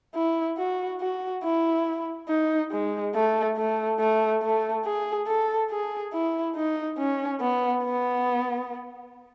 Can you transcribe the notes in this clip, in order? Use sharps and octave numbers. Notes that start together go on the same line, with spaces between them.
E4
F#4
F#4
E4
D#4
G#3
A3
A3
A3
A3
G#4
A4
G#4
E4
D#4
C#4
B3
B3